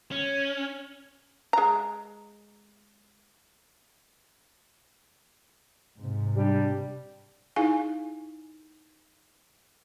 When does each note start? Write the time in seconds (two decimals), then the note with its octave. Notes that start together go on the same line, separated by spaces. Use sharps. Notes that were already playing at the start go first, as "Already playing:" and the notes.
0.12 C#4
1.53 G#3 A#5
5.99 G#2 C3
6.36 G3 D4
7.56 D#4 E4 G#4 F5 G#5